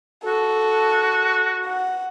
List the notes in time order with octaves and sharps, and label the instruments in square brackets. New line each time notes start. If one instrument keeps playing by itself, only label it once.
[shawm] F#4 [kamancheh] A4
[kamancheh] F#5